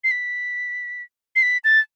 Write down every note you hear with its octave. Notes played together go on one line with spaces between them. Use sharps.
C7
B6
C7
B6
A6